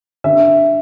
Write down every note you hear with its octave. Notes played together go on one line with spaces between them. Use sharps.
D3 E5